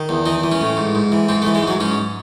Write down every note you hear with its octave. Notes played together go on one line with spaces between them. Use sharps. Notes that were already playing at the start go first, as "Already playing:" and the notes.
Already playing: D#3
E2
E3 D#4
E3
C#4
A2
G#2
G#2
E3
G#2 C4
A3
E3
G#3
G#2 F#3
G#2 C#4